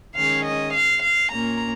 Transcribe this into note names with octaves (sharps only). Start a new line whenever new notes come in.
D#3 G#3 C#4 F5
D#5
F5
F5
A#2 A#3 C#4 A#5